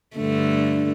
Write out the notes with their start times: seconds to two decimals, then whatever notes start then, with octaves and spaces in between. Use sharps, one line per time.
0.17 G2 D3 A3